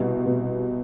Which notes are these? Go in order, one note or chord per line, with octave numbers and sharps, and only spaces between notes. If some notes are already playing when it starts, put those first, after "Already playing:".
Already playing: C2 B2
B2